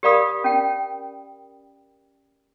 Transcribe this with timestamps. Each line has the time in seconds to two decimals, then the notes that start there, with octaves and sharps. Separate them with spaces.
0.03 G4 A#4 D5 F5 B5 D#6
0.44 C#4 G5